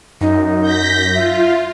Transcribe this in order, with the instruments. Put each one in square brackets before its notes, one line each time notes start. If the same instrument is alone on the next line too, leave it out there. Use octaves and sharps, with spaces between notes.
[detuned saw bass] F#2 [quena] D#4
[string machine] G6 A#6 B6
[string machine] F4 [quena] E5